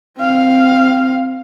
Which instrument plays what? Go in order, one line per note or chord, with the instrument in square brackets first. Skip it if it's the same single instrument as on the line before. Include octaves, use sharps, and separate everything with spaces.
[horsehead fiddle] C4 F5